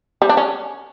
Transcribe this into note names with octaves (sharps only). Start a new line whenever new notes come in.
G3
D4
C#4